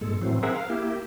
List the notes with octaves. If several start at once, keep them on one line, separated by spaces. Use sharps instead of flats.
G2 A#2 G#3 A4
A2 E3 F#3 C4
C4 G#4 A#4 E5 F#5
F5
A#3 E4 G4